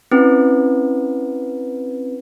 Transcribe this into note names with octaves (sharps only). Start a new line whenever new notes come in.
C4 C#4 E4 B4